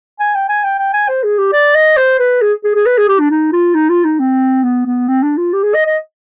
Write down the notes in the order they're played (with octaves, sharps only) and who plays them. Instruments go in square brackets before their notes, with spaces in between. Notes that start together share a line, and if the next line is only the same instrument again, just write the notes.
[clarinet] G#5
G5
G#5
G5
G5
G#5
C5
G#4
G4
D5
D#5
C5
B4
G#4
G#4
G#4
B4
G#4
G4
D4
D#4
F4
D#4
F4
D#4
C4
B3
B3
C4
D4
F4
G4
G#4
D#5
D#5